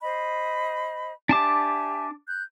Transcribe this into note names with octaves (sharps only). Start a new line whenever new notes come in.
C5 D#5 B5
D4 G4 E5 G#5 A5 D6
F#6 G6